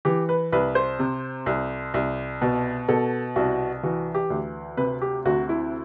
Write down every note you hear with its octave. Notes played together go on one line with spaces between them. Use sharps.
E3 G4
B4
C2 B4
C5
C3
C2
C2
B2
B2 A4
C2 F#4
E3 F#4
G4
D2
C3 B4
G4
D2 F#4
E4